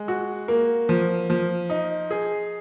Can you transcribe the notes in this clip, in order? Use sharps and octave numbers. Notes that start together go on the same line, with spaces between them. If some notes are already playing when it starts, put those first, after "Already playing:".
Already playing: G#3
F#4
A#3
F3
F3
D#4
G#4